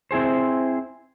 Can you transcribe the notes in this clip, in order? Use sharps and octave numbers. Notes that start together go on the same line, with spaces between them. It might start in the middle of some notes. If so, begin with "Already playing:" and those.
C4 E4 G#4 C5